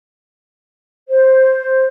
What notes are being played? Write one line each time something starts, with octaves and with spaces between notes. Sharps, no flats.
C5